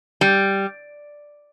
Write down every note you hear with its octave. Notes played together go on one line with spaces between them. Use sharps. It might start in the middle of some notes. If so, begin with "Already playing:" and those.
G3